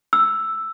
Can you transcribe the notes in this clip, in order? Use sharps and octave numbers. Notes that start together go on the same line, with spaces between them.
E6